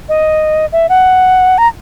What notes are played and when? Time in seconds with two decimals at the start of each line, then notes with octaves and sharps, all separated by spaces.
0.09 D#5
0.72 E5
0.89 F#5
1.58 A#5